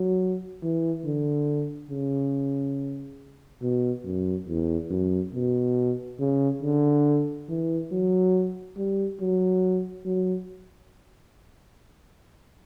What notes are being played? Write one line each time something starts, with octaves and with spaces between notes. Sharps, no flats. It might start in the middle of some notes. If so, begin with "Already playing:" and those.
Already playing: F#3
E3
D3
C#3
B2
F#2
E2
F#2
B2
C#3
D3
E3
F#3
G3
F#3
F#3